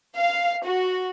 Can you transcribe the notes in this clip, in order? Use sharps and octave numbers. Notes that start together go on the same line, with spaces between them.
F5
F#4